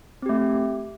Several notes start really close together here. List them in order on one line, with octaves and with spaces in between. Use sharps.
C4 G4 A3